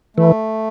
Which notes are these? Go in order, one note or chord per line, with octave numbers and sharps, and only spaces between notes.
E3 A3